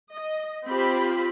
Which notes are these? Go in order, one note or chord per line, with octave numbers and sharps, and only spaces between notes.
D#5
C4 F4 G4 C5 B5